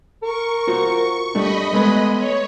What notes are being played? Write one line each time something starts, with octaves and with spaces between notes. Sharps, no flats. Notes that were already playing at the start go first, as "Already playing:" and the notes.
A#4 C#6
F4 F#4 C5
G3 A3 D4 D#5 B5
G#3 A3 B3 B4
C#5